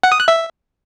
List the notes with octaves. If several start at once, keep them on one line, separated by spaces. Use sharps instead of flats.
F#5
D#6
F#6
E5